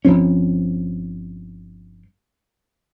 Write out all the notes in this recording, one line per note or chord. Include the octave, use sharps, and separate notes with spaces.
G1 F3 C4 C#4